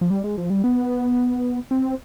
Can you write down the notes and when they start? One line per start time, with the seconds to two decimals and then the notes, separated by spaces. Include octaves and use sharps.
0.01 F3
0.10 G3
0.24 G#3
0.38 F3
0.50 G3
0.64 B3
1.71 C4